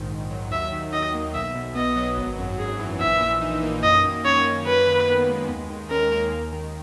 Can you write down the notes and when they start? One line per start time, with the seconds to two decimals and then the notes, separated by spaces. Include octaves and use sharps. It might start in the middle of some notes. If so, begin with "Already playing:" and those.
Already playing: A#1 G#2 D#3
0.10 A#1
0.31 F#3
0.51 D#2 E5
0.72 D#3
0.93 D#4 D#5
1.14 A#3
1.34 B1 E5
1.55 B2
1.76 B3 D#5
1.96 F#3
2.18 G#1
2.38 F#2
2.59 G#1 G#4
2.80 E3
3.00 A#1 E5
3.21 A#2
3.42 D#4
3.63 A#3
3.83 F#2 D#5
4.05 D#3
4.25 C#4 C#5
4.45 A#3
4.66 F#2 B4
4.87 D#3
5.08 B3
5.28 G#3
5.49 D#2
5.70 D#3
5.90 C#4 A#4
6.12 A#3
6.33 D#2
6.52 D#3